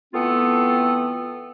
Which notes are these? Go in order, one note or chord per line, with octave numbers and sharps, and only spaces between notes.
E3 A3 B3 C4 F4 A4